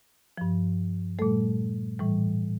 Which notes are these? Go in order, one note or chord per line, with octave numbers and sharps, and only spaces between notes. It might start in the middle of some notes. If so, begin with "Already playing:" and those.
G2 F3
A#2 G3 A3 A4
A2 E3 G3